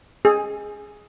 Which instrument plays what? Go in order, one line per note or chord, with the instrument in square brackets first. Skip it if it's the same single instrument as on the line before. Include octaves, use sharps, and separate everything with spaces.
[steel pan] G#4